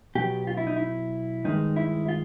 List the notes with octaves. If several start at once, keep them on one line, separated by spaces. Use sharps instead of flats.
B2 F#3 B3 G4
F4
E4
D#4
E4
G2 D#3 G#3 D#4
E4
F4